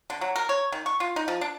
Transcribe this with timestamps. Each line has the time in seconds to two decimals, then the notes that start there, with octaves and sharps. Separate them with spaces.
0.10 D3
0.21 F#3
0.36 A#4
0.49 C#5
0.72 D#3
0.86 C#6
1.00 F4
1.16 D#4
1.28 F3
1.41 D4